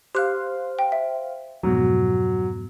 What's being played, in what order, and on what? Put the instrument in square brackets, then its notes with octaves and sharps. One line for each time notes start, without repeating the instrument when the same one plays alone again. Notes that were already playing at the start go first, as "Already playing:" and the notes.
[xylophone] G4 F#6 [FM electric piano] C5 F5
[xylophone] G5
E5
[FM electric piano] F2 G#2 B2 [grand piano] F#3